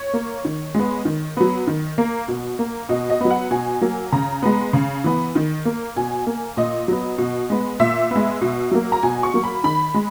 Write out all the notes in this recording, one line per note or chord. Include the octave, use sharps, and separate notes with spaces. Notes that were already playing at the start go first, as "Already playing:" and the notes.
Already playing: C#5
A#3
D#3
G#3 B3
D#3
F#3 B3
D#3
A#3
B2
A#3
B2 D#5
D#5
F#3 B3
F#5
B2 G#5
F#3 A#3
C#3 A#5
G#3 B3
C#3
E3 B3
D#3
A#3
B2 G#5
A#3
A#2 D#5
F#3 B3
B2
G#3 B3
A#2 E5
G#3 B3
B2
F#3 A#3
A#5
B2 G#5
C#6
F#3 A#3
B5
D#3 B5
G#3